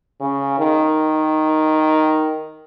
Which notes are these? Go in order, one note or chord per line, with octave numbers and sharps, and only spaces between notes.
C#3
D#3